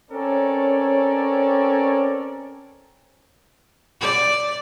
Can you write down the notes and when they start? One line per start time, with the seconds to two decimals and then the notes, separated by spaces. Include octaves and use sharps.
0.11 C4 C#4 A4 A#4 C#5 D5
4.01 D5